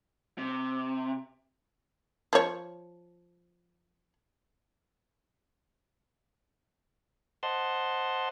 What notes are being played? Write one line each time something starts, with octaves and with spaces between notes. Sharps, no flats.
C3
F3 C#5
C5 D#5 F#5 A5 C6